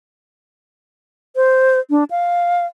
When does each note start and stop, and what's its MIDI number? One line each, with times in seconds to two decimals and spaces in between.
1.36 1.80 72
1.90 2.04 62
2.11 2.66 77